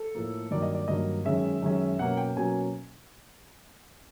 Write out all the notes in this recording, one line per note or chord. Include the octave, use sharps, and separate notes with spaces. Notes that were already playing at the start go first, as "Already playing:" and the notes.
Already playing: A4
A2 F3 A#3
G2 D#3 F#3 A#3 D5
D#5
D5
G2 D#3 F#3 A#3 D#5
F#2 D#3 G#3 C#4 E5
F#2 D#3 G#3 C#4
B2 F#3 A#3 C#4 F#5
G5
B2 F#3 A#3 C#4 G#5